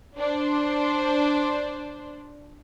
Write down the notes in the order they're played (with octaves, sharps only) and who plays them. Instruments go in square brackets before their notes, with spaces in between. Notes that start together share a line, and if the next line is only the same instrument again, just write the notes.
[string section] D4 C5